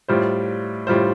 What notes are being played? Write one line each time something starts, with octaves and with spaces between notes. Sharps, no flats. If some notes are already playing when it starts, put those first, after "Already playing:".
A2 G3 F4 C5
A2 G3 F4 C5